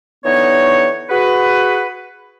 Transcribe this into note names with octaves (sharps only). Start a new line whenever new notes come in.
D3 E3 B3 D#4 C#5
F#4 G#4 B4